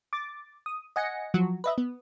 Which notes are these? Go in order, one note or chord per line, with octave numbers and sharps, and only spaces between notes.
D6 A6
D#6
D#5 F#5 G#5 A#6 C#7
F3 F#3 F#4
B4 D#5 E5
B3